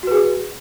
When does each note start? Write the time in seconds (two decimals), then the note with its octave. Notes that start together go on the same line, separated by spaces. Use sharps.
0.03 F#4
0.07 B4
0.11 G#4